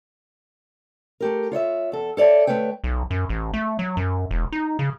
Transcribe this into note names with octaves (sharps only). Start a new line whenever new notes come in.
A3 G4 A#4
F4 C#5 D#5 E5
E2 A4
A4 C#5 D5 E5 A5
D2 C#3 A3 B4 C#5 G5
B1
F#2
A1
A3
F#3
F#2
E1
D#4
C#3